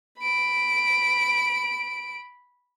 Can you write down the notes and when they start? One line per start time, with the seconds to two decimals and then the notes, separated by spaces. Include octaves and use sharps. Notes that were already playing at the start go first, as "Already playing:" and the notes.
0.19 B5 D7